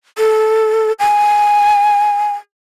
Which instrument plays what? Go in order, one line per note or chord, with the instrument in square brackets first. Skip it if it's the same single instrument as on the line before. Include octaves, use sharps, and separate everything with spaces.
[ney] A4
G#5